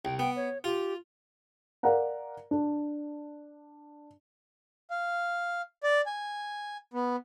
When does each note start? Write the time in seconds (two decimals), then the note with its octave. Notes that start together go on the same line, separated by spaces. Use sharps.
0.05 C2 G5
0.19 B3 G5
0.36 C#5
0.64 F4 G4
1.83 A#4 D5 F5 F#5 A#5
2.51 D4
4.90 F5
5.83 D5
6.06 G#5
6.94 B3